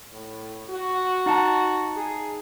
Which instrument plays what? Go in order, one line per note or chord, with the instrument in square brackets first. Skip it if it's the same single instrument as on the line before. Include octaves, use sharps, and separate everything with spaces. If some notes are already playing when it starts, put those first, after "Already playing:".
[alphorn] A2
F#4
[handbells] D#4 F#5 A5
[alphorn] G#4